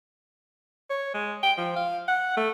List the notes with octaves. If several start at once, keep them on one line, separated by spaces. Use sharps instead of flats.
C#5
G#3
G5
F3
F5
F#5
A3